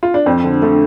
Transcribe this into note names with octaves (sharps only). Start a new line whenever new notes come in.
F4
D4
F2 C4
D3
D3 A3